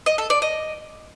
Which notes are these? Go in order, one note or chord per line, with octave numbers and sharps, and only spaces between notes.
D#5
A4
D5
D#5